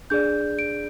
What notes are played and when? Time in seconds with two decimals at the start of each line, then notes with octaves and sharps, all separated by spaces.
0.10 D4 G#4 D5 G6
0.59 D7